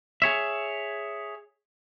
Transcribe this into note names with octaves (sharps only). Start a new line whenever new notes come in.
G#4 C#5 E5